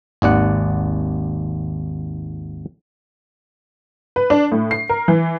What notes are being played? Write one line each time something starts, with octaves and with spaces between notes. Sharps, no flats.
G#1 D#2 D5 F#5
B4
D4
A2
C7
A#4
E3